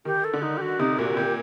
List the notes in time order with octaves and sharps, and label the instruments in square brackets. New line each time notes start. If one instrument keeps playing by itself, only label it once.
[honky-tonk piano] D#3 [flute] G4
[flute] A4
[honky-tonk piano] D3
[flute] D#4
G4
F#4
[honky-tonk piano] C3 [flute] D#4
[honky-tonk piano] A#2 [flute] F#4
[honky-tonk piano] A#2 [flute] G4